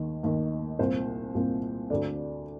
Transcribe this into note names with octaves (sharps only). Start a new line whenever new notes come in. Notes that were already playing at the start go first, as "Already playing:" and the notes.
Already playing: D#2 D#3
D#2 D#3
C2 A#2 C5
C2 A#2
D2 D3 D5